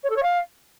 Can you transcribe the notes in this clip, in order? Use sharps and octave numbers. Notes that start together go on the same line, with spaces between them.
C#5
A4
C#5
F5